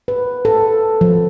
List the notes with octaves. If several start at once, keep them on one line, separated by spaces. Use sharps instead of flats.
B4
A4
F3